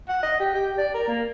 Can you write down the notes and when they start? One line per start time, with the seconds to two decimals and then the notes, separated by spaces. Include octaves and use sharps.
0.09 F#5
0.23 D#5
0.40 G4
0.54 G4
0.78 D5
0.94 A#4
1.08 A#3